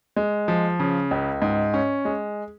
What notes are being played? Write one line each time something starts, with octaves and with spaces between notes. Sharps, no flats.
G#3
F3
C#3
C#2
G#2
C#4
G#3